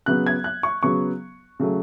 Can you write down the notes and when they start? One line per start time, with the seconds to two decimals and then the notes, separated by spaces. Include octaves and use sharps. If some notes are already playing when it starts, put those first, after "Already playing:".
0.06 C#3 F#3 B3 F#6
0.26 G#6
0.44 F#6
0.63 C#6
0.83 C#3 F#3 B3 C#6
1.60 C#3 F#3 A3